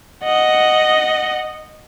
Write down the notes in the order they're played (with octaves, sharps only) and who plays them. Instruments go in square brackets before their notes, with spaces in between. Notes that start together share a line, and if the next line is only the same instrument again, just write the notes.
[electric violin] D#5 F#5